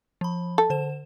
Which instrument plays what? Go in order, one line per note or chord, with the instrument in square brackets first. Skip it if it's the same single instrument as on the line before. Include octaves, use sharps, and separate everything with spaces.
[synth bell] F3 B5
[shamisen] A4
[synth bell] D3 C5 E7